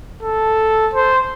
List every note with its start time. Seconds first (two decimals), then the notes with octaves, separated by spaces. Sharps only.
0.23 A4
0.93 C5